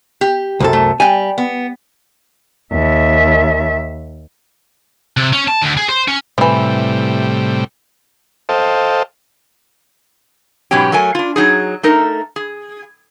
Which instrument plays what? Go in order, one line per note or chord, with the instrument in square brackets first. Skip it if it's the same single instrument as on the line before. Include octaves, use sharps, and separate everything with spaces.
[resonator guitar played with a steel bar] G4
[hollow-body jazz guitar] C2 F#2 A4
[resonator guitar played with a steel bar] A3
[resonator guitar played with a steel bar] G3 G5 [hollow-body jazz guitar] G#5
[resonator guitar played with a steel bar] B3
[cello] D#2 E5
[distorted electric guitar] C3
C#4
A5
D2
G#4
C5
C#4
[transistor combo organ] A2 C3 G3 [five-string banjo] E3 F3
[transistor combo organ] A4 C5 D#5 F5 G5 A5
[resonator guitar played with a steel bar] G#2 B2 F#3 B3 C#4 G4
F#3 A3 A#4 G#5
D4 F4
F#3 D#4 G#4
A3 D#4 A#4
G#4